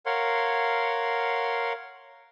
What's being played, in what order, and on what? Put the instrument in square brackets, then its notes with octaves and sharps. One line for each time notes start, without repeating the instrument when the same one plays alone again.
[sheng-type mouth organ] A#4 C#5 F5 F#5 C6